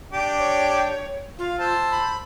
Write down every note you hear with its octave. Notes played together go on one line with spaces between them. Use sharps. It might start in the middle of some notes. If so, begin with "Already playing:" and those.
D4 G4
C#5
F4 F5
C5 A5 E6
B5